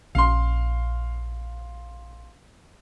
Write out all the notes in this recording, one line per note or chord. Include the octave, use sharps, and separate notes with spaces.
A#1 C#4 F5 C6